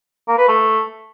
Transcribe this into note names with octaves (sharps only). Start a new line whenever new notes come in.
A#3
B4
A3